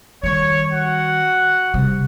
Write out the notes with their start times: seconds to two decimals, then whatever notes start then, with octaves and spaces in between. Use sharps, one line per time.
0.23 D#3 G3 C#5
0.73 F#4 F#5
1.74 C3 G3